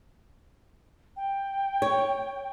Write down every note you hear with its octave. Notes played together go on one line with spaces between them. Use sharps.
G5
C#5